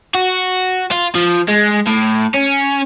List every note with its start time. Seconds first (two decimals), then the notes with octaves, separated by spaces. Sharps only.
0.15 F#4
0.92 F4
1.15 F3
1.48 G#3
1.87 A2
2.34 C#4